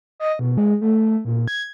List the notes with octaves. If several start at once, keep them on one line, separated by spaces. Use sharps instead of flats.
D#5
B2
G#3
A3
A#2
G#6